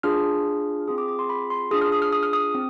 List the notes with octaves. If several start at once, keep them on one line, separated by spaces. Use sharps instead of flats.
D4 F4 G#4 F6
C4 F4 G#4 D#6
D6
D6
C6
B5
C6
D4 F4 G#4 D#6
F6
D#6
F6
D#6
F6
D#6
C4